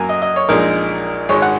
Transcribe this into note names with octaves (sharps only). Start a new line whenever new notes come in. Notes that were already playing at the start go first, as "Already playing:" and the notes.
Already playing: F#2 F#3 A#3 G#5 A#5
D#5
D#5
C#5
A#1 A#2 G#3 D#4 A#4
G#1 G#2 G#3 C#5
F#5